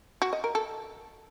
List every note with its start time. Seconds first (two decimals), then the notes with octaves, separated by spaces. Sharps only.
0.22 F#4
0.33 D#5
0.44 A#4
0.55 A4